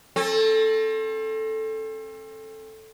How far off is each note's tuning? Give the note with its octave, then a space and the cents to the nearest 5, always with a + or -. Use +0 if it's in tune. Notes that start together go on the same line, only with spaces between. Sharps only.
C4 +40 A4 +0